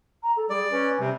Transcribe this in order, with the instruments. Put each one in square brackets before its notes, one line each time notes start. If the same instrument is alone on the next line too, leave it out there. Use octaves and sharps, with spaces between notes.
[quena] A#5
A4
[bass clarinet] G3 [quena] G#4 [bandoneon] D5
[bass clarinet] C#4 [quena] B4
[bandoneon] C3 [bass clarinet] G3